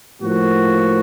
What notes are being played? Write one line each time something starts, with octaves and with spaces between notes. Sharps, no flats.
A2 F3 A#3 F#4